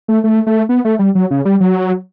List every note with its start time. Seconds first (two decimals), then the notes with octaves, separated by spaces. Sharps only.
0.08 A3
0.24 A3
0.47 A3
0.69 B3
0.85 A3
0.99 G3
1.15 F#3
1.31 C#3
1.45 G3
1.60 F#3